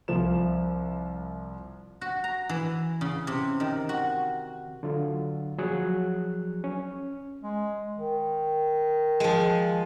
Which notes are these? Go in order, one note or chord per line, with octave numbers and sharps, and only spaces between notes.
C2 F3 E7
F#4
A#5
E3
C#3
C3
D#3
F#4
D3 F#3 F4
F3 F#3 G#4 F#6
C#4
G#3
D#3
F3 G#3